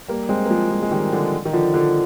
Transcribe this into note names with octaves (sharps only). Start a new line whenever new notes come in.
G3 A#3
G#3 C4
A#3
F3 G#3
F3 G#3
G#3
D#3 G3
D3 F3
D#3
D3 F3
D3 F3